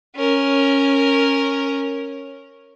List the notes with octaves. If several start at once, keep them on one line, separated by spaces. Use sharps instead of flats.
C#4 A#4